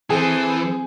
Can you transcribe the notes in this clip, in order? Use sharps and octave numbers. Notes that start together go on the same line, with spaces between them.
E3 C4 G#4 A4 C5